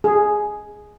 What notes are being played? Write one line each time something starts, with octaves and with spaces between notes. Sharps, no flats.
G#4